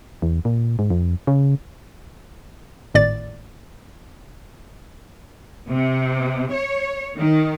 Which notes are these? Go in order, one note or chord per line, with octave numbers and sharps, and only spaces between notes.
E2
A#2
G#2
F2
C#3
G#1 A2 D5 A6
C3
C#5
D#3